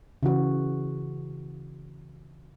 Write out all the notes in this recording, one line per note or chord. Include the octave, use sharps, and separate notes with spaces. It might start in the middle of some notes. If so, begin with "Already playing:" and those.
C#3 E3 F#4